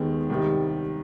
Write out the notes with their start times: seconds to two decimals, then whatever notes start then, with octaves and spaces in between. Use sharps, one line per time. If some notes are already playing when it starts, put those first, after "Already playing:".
Already playing: D#2 D#3 G#3 B3
0.30 C2 C3 D#3 G3